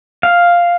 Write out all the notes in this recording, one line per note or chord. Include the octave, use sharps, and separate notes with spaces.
F5